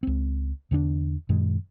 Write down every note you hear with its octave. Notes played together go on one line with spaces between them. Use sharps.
C#2 C4
E2 D3 C4 D4
F#2 A#2 D#3 G#3